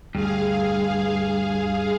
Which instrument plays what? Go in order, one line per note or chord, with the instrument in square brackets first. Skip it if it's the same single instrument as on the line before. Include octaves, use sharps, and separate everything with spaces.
[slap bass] D2 [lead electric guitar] G2 [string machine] G#4 F5